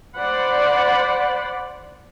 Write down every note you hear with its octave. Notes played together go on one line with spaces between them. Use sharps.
C5 D5 F#5 B5